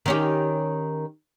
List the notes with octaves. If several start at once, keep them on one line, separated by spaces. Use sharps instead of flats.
D#3 C#4 G4